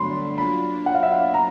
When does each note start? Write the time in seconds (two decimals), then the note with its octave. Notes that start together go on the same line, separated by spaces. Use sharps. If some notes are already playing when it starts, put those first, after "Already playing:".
Already playing: G2 D3 F#3 A3 D4 B5 C6
0.38 F#3 A#3 D4 F4 B5
0.86 F#5
0.95 F5
1.03 E5
1.12 F5
1.34 A#5